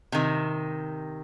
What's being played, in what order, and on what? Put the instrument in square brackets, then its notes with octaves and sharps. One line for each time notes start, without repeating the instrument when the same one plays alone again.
[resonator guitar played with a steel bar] C3 D#3